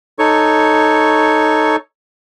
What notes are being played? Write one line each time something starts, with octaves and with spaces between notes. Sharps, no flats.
D#4 A4 C#5 C#6